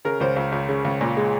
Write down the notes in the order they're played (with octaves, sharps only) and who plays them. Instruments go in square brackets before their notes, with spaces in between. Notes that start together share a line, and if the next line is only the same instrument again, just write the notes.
[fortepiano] C#3 A#4
C#2 C5
C#2
C#2
C#3
C#2
A#2
G#3